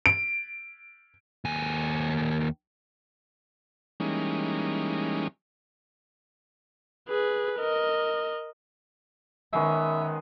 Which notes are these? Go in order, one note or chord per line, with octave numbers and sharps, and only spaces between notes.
D7
D#2 G#5
E3 G3 G#3 A#3 C#4 D#4
G#4 B4
A#4 D#5
D#3 G#3 B3 C#4 E5